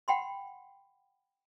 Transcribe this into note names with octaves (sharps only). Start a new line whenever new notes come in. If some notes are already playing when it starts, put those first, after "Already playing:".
F#5 G5 B5 C6